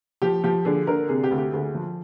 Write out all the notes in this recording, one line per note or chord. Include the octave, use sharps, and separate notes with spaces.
F3 G4
F3 G4
D3 G#4
D3 A#4
C3 G#4
G4
D2
G4
D2 G#4
F3